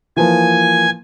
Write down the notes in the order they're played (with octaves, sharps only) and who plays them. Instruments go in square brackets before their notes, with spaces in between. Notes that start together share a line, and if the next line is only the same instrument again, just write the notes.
[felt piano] E3 F3 A#3 [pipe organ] G#5